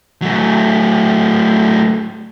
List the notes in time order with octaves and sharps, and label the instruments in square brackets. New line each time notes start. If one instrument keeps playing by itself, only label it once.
[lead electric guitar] F#3 A3